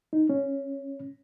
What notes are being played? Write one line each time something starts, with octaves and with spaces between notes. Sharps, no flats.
D#4
C#4